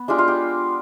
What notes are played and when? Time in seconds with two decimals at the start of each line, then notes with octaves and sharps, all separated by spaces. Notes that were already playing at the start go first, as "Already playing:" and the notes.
Already playing: B3
0.08 G#3 D4 F4 G4
0.18 F4
0.28 G4